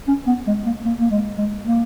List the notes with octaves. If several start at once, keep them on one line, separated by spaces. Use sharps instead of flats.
C#4
B3
G#3
A#3
A#3
A#3
G#3
G#3
A#3